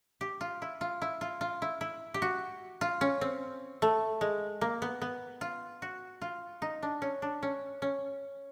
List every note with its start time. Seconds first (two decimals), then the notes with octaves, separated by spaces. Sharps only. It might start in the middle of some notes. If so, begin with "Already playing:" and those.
0.21 G4
0.41 F4
0.62 E4
0.81 F4
1.02 E4
1.21 F4
1.41 F4
1.62 E4
1.81 E4
2.14 G4
2.22 F#4
2.81 F4
3.01 C#4
3.21 C4
3.82 A3
4.21 G#3
4.61 A#3
4.82 B3
5.02 B3
5.41 F4
5.82 F#4
6.21 F4
6.62 D#4
6.83 D4
7.02 C#4
7.22 D4
7.43 C#4
7.82 C#4